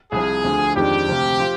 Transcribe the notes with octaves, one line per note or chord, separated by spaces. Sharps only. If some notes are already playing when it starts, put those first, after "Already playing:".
C2 C3 F3 G#4
D2 D3 F3
F2 D#3 G#3 D4 G4
D2 C3 F3 C4 F4
F3 C4 F4 C5